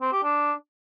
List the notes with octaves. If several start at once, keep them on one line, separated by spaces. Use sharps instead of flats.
C4
G4
D4